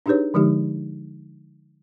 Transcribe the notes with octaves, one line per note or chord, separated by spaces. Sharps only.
D4 D#4 G4 G#4 B4 C#5
D3 F3 G#3 D#4 G4